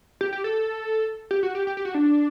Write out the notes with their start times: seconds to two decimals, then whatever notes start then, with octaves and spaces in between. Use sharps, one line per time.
0.21 G4
0.33 G4
0.44 A4
1.31 G4
1.43 F#4
1.55 G4
1.67 G4
1.77 G4
1.85 F#4
1.95 D4